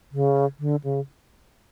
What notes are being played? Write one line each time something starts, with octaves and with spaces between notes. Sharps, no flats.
C#3
D3
C#3